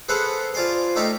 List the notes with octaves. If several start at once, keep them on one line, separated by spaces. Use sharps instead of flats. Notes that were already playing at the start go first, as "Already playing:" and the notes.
G#4 A4 B4 C5 F5 F#5
F4 C5 D5 G#5 C6
A3 D#4 D5 E5 F5 G5